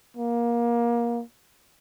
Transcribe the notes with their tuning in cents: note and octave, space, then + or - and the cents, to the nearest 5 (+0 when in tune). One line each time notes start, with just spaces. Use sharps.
A#3 +20